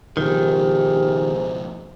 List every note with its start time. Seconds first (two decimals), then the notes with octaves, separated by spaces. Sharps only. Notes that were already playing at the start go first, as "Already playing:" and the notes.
0.17 C#2 G#2 B2 D#3 F3 G4